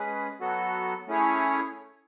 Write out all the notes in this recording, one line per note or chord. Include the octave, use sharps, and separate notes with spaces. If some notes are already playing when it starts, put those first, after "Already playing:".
Already playing: G#3 C#4 G#4 B4
F#3 B3 F#4 A4
A3 C#4 E4 G#4 C#5